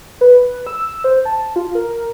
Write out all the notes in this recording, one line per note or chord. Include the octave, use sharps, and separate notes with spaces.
B4
E6
C5
A5
F4
A#4